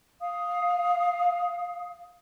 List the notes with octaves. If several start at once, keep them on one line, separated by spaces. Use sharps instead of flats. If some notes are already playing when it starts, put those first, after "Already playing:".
F5 D#6